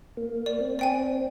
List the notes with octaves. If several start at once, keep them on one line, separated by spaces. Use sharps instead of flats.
A#3
D5
C4
D5 G5 G#5